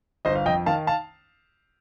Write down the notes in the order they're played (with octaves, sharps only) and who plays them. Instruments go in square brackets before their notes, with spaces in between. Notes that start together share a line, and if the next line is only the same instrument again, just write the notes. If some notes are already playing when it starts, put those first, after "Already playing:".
[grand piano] G1 C5 D#5
F5
F2 D#5 G5
D#3 F5 A5
F5 A5